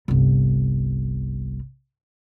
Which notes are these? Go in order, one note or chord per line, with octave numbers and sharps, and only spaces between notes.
G1 C2